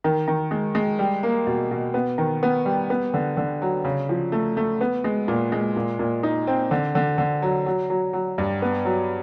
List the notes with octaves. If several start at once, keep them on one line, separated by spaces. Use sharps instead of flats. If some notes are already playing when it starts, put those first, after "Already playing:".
D#3
D#3
G#3
G#3
G3
A#3
B2
B2
B3
D#3
B3
G3
B3
D3
D3
F#3
C#3
F3
A3
A3
B3
G#3
A#2
G#3
A#2
A#2
D#4
C4
D3
D3
D3
F#3
F#3
F#3
F#3
G2
B3
F#3